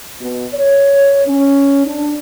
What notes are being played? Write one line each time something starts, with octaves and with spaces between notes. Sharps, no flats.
B2
C#5
C#4
D4